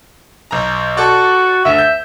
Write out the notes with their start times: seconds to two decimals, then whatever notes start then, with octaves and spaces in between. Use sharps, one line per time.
0.51 B1 A#5
0.97 F#4 A4 D5
1.65 D2 D3 E5
1.79 G6